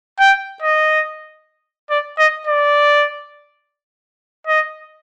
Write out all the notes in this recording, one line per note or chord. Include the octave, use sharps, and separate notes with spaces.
G5
D#5
D5
D#5
D5
D#5